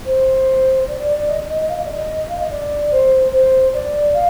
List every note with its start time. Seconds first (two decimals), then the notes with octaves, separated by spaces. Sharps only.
0.06 C5
0.88 D5
1.08 D5
1.28 D#5
1.48 D#5
1.69 F5
1.77 D#5
1.86 D5
1.93 D#5
2.29 F5
2.40 D#5
2.50 D5
2.91 C5
3.32 C5
3.73 D5
4.14 F5